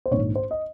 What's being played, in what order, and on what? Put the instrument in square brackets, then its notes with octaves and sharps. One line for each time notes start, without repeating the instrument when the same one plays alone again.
[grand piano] C5
A#1 G#2 D#3 C#5
C5
D#5